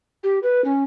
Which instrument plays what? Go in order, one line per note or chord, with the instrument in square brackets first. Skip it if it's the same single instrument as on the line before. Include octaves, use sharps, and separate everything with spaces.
[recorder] G4
B4
C#4